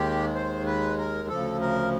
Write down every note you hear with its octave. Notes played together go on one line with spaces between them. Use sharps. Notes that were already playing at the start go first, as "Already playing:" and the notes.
Already playing: D#2 D#3 G#3 G4
C5
B4
A#4
D2 C#3 F3 A4
A#4